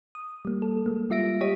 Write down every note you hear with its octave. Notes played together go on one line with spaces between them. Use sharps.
D#6
G3 A#3
A4
G#3 A#3
G3 F4 E5 A#6 D7
G4 C#5 D#5 B6 D#7